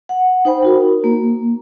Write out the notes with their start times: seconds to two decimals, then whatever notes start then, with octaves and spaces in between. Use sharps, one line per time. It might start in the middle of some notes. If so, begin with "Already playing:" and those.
0.09 F#5
0.45 D#4 C5 G5 B5
0.63 D#4 F#4 A#4
1.04 A#3